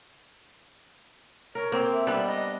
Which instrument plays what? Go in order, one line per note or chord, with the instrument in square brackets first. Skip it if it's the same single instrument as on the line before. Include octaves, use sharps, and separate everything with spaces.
[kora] A#4 [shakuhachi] C#5
[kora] A#3 C4
[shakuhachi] E5
[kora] G3 B3 D4
[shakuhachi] D#5